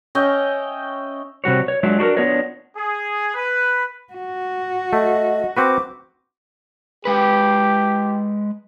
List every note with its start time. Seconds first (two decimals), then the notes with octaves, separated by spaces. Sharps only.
0.15 C#4 D#5 E5 G5
1.44 C3 G3 F#4 C#5
1.68 C#5
1.83 F#3 G#3 D4 F4 E5
1.99 D4 F#4 G4 A#4
2.17 B3 D4 F4 C#5 D#5
2.76 G#4
3.34 B4
4.13 F#4
4.93 A3 D#5
5.57 C4 F#4 B4 D6
7.05 G#3 G4 B4